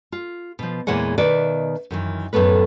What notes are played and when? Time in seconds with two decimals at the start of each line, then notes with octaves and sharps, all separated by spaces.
0.12 F4
0.59 B2 F3
0.87 E2 A#2 E3 G#3 C#5 F#5
1.18 B2 D#3 B4 D5 E5
1.91 F#2 D#3 E3
2.33 F#2 A2 A3 B3 B4